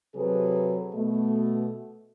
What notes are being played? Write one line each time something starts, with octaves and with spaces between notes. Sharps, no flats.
C3 F#3 G#4 A4 B4
B2 A3